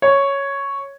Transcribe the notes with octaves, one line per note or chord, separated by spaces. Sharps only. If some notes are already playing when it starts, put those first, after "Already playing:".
C#5